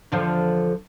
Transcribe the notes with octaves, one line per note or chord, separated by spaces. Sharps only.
E2 D3 F3